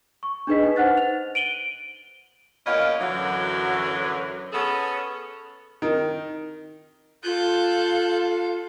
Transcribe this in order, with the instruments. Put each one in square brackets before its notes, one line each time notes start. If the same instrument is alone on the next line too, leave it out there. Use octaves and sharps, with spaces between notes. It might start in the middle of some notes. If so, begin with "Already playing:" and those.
[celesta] C#6
D4 D#4 G#4 B4 D#5 B6
D#4 B4
C5 F#5 F#6 A6
F7
D7 D#7 F#7 G7
[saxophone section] E2 A#3 C#4 F4 D#5
F#2 D3 E3 F#3
B3 C#4 G#4 A4
[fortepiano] D#3
[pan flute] F4 [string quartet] A4 F5 [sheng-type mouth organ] F#6 G6